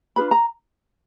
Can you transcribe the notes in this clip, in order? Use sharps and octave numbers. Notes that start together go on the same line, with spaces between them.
D4 F4 G#4 B4 B5
A#5